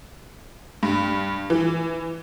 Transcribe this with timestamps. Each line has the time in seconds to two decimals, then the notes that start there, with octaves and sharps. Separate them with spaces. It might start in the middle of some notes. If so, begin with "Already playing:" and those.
0.83 G2
1.50 E3